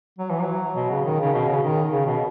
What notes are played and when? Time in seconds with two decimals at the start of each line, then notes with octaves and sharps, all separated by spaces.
0.19 F#3
0.31 E3
0.42 F#3
0.76 B2
0.91 C#3
1.05 D#3
1.20 C#3
1.34 B2
1.49 C#3
1.63 D#3
1.92 C#3
2.07 B2